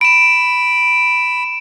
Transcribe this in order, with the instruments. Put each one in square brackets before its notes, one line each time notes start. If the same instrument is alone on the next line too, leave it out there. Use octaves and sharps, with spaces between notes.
[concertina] B5 [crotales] D7 E7